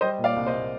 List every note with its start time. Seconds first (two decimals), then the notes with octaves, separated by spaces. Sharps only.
0.01 G3 C5 D#5
0.18 A#2
0.24 D5 F5
0.36 C2
0.47 C5 D#5
0.52 A#2